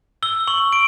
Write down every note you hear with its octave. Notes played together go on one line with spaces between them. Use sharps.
E6 G7
C#6 F#7
D7